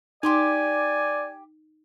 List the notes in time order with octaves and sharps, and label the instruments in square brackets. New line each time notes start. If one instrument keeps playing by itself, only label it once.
[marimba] D#4 [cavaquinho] G4 C6 D6 [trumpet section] D5 [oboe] G#5